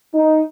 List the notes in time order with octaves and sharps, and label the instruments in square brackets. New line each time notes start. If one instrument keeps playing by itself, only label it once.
[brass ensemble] D#4